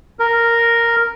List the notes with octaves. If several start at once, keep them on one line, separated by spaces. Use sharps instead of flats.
A#4